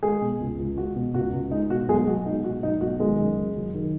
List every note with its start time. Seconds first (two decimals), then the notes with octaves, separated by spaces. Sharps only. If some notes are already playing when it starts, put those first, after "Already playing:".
0.03 G#3 G#4
0.21 B2
0.40 C#2
0.59 C#2
0.77 G#3 F#4
0.96 B2
1.14 C#2 F#4
1.33 C#2
1.51 G#3 D#4
1.70 B2 F#4
1.88 B1 G#3 G#4
2.07 B1 F#4
2.25 G#3 D#4
2.44 B2 F#4
2.63 B1 D#4
2.81 B1 F#4
3.00 D#3 G#3 G#4
3.19 F#2
3.37 F#1
3.55 F#3
3.74 D#3